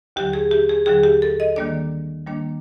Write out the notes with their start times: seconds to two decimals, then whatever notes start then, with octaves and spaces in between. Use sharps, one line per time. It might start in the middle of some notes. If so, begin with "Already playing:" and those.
0.16 D#2 D3 F#3 G4
0.33 G#4
0.51 G4
0.69 G#4
0.86 D#2 D3 F#3 G#4
1.03 G4
1.22 A4
1.40 D#5
1.56 D#3 G3 A#3 D4 D5
2.27 D#3 G3 A#3 D4